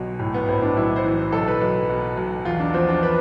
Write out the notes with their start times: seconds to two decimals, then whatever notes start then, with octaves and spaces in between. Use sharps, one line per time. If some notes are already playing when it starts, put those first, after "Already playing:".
Already playing: B1 B2
0.20 A2
0.34 B3
0.48 A2 C4
0.63 D4
0.77 B1 E4
0.96 C5
1.05 E3
1.32 B1 A4
1.48 B4
1.61 B1
1.89 B2
2.17 B1
2.45 E2 F4
2.60 D4
2.74 F3 C4
2.88 D4
3.03 B4